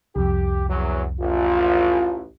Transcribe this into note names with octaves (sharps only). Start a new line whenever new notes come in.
C2 F2 G4
E2 F#3
A1 F4